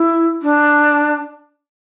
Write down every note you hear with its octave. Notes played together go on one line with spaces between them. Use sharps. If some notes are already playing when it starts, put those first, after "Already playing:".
Already playing: E4
D4